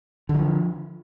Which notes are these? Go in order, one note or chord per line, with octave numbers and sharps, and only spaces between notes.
D3 E3 F3